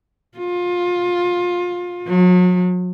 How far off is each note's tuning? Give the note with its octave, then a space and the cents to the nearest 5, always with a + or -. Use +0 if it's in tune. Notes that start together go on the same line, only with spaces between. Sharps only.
F4 +20
F#3 -40